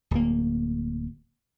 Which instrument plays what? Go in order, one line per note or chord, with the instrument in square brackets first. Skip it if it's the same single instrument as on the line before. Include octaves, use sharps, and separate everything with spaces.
[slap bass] D1 A#3